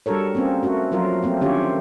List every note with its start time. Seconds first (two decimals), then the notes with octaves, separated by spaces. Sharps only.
0.06 G3 D4 F#4 A4 A#4 C#5
0.35 A#3 C4 C#4
0.63 A3 F#4 A#4
0.92 F3 F#3 F4 A#4
1.23 A3 A#3 C4
1.41 D3 D#3 C#4 F4 G4 C#5